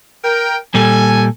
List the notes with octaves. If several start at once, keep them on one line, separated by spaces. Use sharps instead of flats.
A#4 G5
A#2 G3 A4 G#5